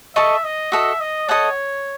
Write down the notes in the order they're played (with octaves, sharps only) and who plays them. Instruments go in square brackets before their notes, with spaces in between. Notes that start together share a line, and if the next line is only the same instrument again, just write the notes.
[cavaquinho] A4 D#5 A5 C#6 [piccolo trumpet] E5
[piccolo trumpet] D#5
[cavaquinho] F#4 A4 D#5 [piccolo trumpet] E5
[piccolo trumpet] D#5
[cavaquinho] A4 D#5 F#5 A5 [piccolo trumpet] C#5